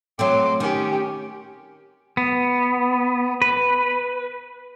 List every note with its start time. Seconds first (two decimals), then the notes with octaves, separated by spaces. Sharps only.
0.19 F#3 A3 C4 C6 D6
0.60 D#3 C#4 G4
2.17 B3
3.42 B4